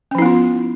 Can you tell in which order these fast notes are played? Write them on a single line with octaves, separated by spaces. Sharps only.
C#4 F3 E4 B3 F4